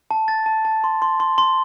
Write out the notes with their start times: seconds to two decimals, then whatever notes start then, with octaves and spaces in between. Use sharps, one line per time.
0.11 A5
0.28 A6
0.46 A5
0.65 A5
0.84 C6
1.02 C6
1.20 C6
1.38 C6